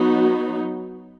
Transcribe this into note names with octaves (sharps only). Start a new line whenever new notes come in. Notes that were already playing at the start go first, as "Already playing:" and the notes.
Already playing: F#3 B3 D#4 F#4